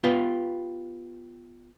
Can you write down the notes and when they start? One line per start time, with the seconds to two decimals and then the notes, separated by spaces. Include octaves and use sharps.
0.04 B3 F4 G4 B4 F5